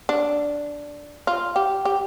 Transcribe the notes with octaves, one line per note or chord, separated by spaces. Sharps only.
D4
F4
G4
G4